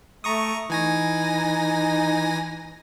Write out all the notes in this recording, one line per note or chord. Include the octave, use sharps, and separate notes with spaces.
A3 A#5 C#6 D#6
E3 D#4 G#5 A#6